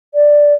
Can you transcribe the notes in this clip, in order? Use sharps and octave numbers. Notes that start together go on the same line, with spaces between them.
D5